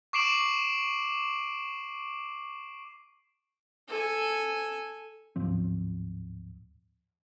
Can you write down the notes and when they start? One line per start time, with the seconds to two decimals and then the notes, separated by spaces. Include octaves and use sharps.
0.13 C#6 D6 C7 D7 E7 F#7
3.88 A4 G#5
5.36 D1 G#2 F3 C4